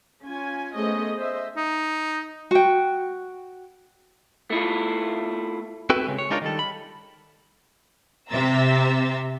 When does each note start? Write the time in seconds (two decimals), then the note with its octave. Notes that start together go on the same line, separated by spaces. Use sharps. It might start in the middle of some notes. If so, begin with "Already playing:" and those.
0.23 C#4 F4 G#5
0.73 A3 B3 C#4 G#4 C5 D#5
1.16 C5 D#5 E5
1.57 D#4
2.51 F#4 G5
4.50 A3 E4 F4
5.90 C4 E4 F#4 A4 B4 G5
6.07 C#3 G#3
6.19 C#5
6.30 G#3 D4 D#4 F4 A#4 C#5
6.42 D#3 G3 A4
6.59 B5
8.30 C3 E5 A#5 C6 E6 A6